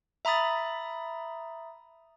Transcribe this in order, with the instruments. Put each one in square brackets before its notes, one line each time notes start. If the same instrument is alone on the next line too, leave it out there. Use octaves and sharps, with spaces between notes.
[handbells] E5 A#5 B5 D#6 A6